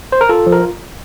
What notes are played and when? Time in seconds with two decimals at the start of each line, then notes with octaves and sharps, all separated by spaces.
0.12 C5
0.21 A#4
0.29 F4 A4
0.47 F3
0.52 A#4